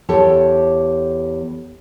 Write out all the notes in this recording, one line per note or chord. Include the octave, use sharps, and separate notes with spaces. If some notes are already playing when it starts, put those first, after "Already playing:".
E2 G4 A4 C#5 A5